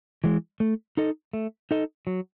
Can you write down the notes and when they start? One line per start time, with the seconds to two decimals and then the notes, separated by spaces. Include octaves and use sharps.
0.24 E3 G#3
0.60 A3
0.97 D#4 A4 D#5
1.33 A3
1.71 D#4 A4 D#5
2.07 F#3